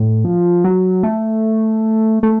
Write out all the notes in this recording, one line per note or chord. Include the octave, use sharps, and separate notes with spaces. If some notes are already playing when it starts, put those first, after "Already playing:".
Already playing: A2
F3
F#3
A3
A3